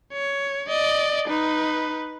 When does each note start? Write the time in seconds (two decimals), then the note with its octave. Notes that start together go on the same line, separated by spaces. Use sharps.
0.14 C#5
0.69 D5 D#5
1.28 D#4 B4